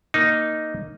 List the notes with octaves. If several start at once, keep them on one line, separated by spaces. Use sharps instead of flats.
A#3 D#4